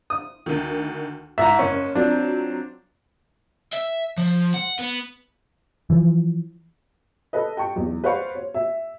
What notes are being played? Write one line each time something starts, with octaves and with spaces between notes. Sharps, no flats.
D#6
D2 D#3
G#2 E4 E5 A#5
F#1 C#4
F#3 C4 D4 F4
E5
F3
F#5
B3
E3 F3
A4 B4 D#5
G5 A5 C#6
B1 E2
B4 C5 D5 F5 F#5 C#6
C#5
E5